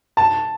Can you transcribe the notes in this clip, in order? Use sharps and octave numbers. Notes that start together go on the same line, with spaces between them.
A5